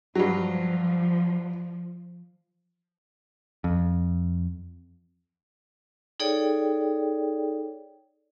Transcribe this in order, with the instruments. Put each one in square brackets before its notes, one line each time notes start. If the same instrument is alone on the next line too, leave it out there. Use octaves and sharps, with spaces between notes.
[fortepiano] G2 F#3 [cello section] F3
[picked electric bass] F2
[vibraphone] D#4 G#4 A4 C#5 D5 G5